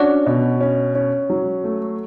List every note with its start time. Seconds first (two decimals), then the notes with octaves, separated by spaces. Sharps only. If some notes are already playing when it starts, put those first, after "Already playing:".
Already playing: C#4 D4 F#4
0.26 B2
0.61 C#4
0.95 C#4
1.30 F#3
1.64 A3